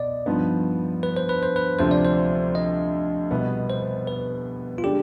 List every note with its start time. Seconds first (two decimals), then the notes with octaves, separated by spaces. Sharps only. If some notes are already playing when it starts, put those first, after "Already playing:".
Already playing: B2 D5 D#5
0.26 G2 F3 B3 D#4
1.03 B4
1.17 C5
1.29 B4
1.43 C5
1.56 B4
1.79 D2 C3 F3 C5
1.91 D5
2.05 C5
2.55 D#5
3.31 C2 B2 B3
3.70 C5
4.07 B4
4.78 F4
4.84 D3 G#3 D4 G4